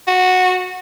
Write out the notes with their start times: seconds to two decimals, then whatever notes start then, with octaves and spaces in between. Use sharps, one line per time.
0.07 F#4